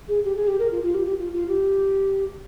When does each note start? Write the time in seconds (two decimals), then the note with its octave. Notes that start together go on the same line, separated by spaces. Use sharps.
0.09 G#4
0.24 G4
0.36 G#4
0.48 G4
0.59 A#4
0.71 F4
0.83 F4
0.94 G4
1.06 G4
1.18 F4
1.33 F4
1.48 G4